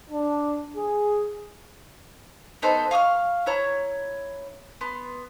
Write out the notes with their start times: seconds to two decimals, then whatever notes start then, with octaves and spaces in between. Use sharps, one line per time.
0.11 D4
0.76 G#4
2.62 B3 D#4 A4 C5
2.91 F5 C#6 D#6 F6
3.46 E4 C#5 A#5
4.81 B3 C6